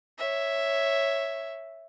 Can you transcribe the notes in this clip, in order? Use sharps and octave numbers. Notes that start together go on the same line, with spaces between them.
C#5 E5